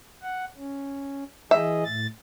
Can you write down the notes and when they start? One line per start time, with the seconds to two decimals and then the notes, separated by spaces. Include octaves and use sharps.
0.22 F#5
0.57 C#4
1.51 E3 G#4 D#5 E5
1.85 A2 A6